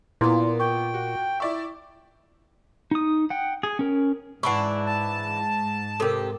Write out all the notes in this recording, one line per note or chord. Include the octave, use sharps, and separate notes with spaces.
A#2 A#3 B3 E4 C6
G5 C#6 D6
F#4
E4 D5 E5 C#6
D#4 D#6
F#5 G5
G#4
C#4 A#4
G#2 E3 D4 E4 F#5 C#6
A5
C3 G4 A4 A#4